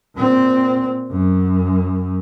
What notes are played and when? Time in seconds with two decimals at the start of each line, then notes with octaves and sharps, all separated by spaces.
0.15 A#2 C4
1.11 F#2